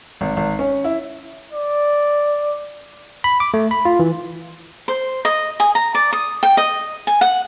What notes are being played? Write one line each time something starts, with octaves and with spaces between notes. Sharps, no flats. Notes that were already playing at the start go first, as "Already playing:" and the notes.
G#1
G#1
C#4
E4
D5
B5
D6
A3
B5
F4
E3
C5
D#5
G#4
A#5
D5
D#6
G5
D#5
G#5
F#5